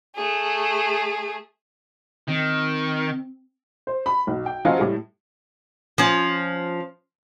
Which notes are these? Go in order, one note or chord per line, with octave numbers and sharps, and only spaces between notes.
A3 G#4
D#3 C4
C5
B5
B1
G5
F3 F#3 C#4 F4 F#4 D#5
A2 G3
F3 C#4